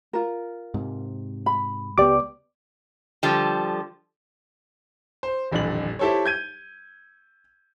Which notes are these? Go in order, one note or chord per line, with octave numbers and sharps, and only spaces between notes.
F4 A#4
G#2 C3
B5
C#2 B3 G4 D5 D6
D3 F3 G3
C5
D#1 A1 F2 D3 F#7
E4 G4 A4 C5 C#5
G6 G#6 D#7